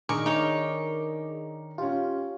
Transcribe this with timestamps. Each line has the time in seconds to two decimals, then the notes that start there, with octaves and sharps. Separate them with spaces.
0.09 D#3 D4 G#4 A#4 C#6 D6
0.26 D#4 C#5
1.78 C#4 F4 G4